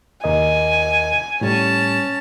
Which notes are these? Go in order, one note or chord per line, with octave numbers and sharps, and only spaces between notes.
D#2 A#4 D#5 G#5
A2 G3 C#4 A5